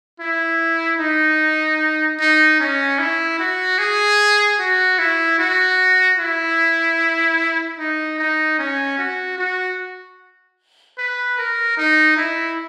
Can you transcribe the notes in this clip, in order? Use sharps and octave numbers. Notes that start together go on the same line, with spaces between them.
E4
D#4
D#4
C#4
E4
F#4
G#4
F#4
E4
F#4
E4
D#4
D#4
C#4
F#4
F#4
B4
A#4
D#4
E4